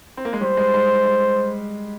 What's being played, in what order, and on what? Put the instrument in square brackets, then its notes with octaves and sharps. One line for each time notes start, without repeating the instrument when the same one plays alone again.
[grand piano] C4
A#3
G#3
[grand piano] G3 [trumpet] C5
[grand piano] G#3
G#3
G#3